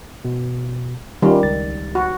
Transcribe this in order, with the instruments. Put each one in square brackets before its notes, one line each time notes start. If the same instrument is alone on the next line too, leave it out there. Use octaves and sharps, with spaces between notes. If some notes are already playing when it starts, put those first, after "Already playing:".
[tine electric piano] B2
[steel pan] D#3 G3 [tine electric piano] C#4 F4
[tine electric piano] C#2 A6
[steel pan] F#4